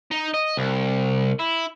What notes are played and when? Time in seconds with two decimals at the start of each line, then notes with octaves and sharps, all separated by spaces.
0.11 D#4
0.34 D#5
0.57 C2
1.40 E4